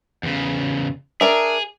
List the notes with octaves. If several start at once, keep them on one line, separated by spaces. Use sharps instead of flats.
E2 C#3
D4 G#4 A#4 E5